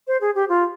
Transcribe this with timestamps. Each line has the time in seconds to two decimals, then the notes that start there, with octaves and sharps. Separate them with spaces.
0.07 C5
0.21 G#4
0.35 G4
0.49 F4